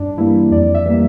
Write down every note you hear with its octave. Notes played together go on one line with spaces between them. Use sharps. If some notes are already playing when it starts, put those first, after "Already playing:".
Already playing: G2 D4
E3 G3 A#3 E4
F2 D5
E5
E3 G3 A#3